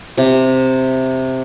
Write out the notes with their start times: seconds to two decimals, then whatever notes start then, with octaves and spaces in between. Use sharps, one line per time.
0.17 C3